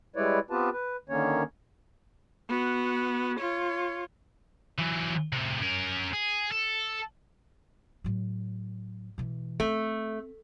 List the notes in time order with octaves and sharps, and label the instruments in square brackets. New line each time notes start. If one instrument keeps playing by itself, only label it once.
[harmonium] G3 G#3 E4 B4 C#5 D5
B3 C4 F4 G4 B4 A5
B4
D3 D#3 A#3 C#4 C#5
[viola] B3 F#4
F4 C#5
[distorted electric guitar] E3 F#3
A2 C3
C#4 A#4
G#4
A4
[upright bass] A2 F#3
B2 E3
[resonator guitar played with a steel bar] A3 [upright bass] C4